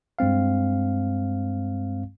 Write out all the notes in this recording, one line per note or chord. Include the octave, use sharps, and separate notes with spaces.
G2 G#3 C4 F5